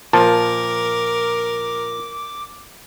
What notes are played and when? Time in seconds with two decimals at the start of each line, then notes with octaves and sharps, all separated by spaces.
0.13 A#2 F3 A#4 A5 D6